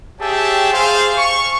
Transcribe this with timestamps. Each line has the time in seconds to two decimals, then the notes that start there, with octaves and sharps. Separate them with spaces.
0.21 G4 G#4 C#5 E5 G5 A5
0.73 G#4 C5 F5
1.18 C#6